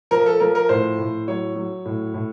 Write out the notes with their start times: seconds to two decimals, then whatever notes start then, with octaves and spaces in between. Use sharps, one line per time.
0.11 F3 A#4
0.26 A4
0.40 F3 A#4
0.55 A#4
0.69 A2 C5
0.99 A2
1.28 F#3 C#5
1.56 F#3
1.85 A2
2.14 A2